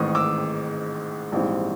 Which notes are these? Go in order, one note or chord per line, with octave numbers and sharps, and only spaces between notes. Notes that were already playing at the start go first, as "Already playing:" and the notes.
Already playing: A1 G#2 D#3 G#3 C4 C#6 D#6
D6 E6
A#1 G#2 E3 G3 C4